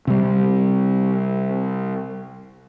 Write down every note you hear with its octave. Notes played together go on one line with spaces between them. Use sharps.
C3 G3